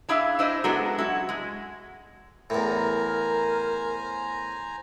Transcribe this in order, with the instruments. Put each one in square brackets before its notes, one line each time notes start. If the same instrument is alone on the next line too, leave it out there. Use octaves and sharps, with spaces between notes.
[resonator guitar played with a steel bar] D4 E4 G#4 E5 F5
D4 E4 C5 D#5
F#3 G#3 B3 D4 F#4 A4
E4 F#4
G#3
[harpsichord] E2 A2 [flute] A#4 [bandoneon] C5 G#5 A#5